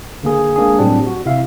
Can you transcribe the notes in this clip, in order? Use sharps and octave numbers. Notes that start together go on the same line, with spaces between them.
D3 A#3 G#4
G#3 A#3 D4 G#4
A2 F#3 G3 C4 D4 G4
F#4
C3 E4 E5 F5